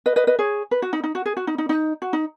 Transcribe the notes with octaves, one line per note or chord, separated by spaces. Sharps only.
B4 D#5
B4 D#5
B4 D#5
G#4 C#5
B4
F#4
D#4
D#4
F#4
G#4
F#4
D#4
D#4
D#4
F#4
D#4